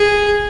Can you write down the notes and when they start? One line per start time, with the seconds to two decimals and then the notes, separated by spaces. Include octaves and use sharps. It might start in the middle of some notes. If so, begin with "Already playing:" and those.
Already playing: G#4